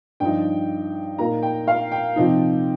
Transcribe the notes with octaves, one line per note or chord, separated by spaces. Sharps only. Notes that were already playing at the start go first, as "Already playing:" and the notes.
G2 F3 D#4 G5
A#2 A#3 D#4 A#5
G5
F5
G5
C3 F3 D#4